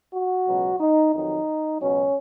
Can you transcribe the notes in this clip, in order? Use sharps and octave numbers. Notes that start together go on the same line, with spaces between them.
F#4
C#2 B2 F#3
D#4
F2 D#3 F#3 D#4
C#2 B2 F#3 C#4